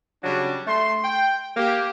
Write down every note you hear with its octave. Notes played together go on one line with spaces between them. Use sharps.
C#3 F#3 G3 D4
A3 C6
G5
A#3 G4